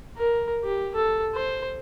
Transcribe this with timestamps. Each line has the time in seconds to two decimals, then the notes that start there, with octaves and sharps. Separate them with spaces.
0.17 A#4
0.64 G4
0.95 A4
1.35 C5